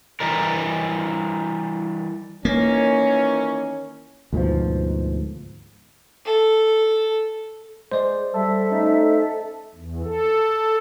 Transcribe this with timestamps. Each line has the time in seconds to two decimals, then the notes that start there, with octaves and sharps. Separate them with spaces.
0.20 E3 G3 A#4
2.45 D#3 E3 A#3 C#4
4.33 D2 G#2 B2 F3
6.25 A4
7.92 G#3 C5 D5
8.34 G3 A4 E5
8.71 A3 C#4 D#4
9.74 E2
10.03 A4